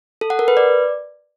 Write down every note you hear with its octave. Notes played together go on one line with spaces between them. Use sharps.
A4
F#5
A#4
B4
D5